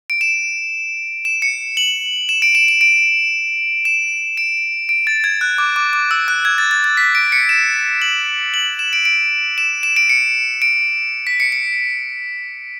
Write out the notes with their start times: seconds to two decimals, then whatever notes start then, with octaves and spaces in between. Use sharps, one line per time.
0.10 D7
0.21 E7
1.25 E7
1.42 C#7
1.77 F#7
2.29 E7
2.42 D7
2.55 E7
2.68 E7
2.81 D7
3.85 E7
4.37 D7
4.89 D7
5.07 A6
5.24 G#6
5.41 F#6
5.58 D6
5.76 D6
5.93 D6
6.11 E6
6.28 F#6
6.45 G#6
6.58 A6
6.71 A6
6.84 A6
6.97 B6
7.15 D7
7.32 C#7
7.49 E7
8.02 F#7
8.54 F#7
8.79 E7
8.93 D7
9.05 D7
9.58 E7
9.83 E7
9.96 D7
10.10 C#7
10.62 D7
11.27 B6
11.40 C#7
11.52 C#7